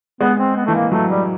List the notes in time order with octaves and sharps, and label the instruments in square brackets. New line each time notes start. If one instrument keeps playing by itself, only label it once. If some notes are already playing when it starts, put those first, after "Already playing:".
[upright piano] G#3 [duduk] B3
[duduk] C4
B3
[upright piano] E3 [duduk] A3
[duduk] A#3
[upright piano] F#3 [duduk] A3
[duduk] G3